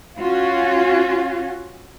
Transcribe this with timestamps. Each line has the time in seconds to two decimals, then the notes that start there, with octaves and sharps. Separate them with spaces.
0.20 C#4 F4 F#4